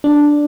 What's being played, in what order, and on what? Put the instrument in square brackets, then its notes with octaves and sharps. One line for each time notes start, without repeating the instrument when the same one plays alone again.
[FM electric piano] D4